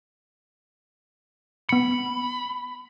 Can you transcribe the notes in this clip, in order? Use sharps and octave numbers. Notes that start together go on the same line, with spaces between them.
B3 B5 C#7